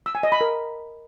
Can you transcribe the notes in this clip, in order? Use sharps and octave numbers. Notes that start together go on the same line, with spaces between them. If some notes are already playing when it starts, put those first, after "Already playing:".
E6
G#5
D#5
B5
A#4